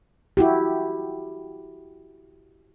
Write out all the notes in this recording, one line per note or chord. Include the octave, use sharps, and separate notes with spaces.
E4 F#4 G4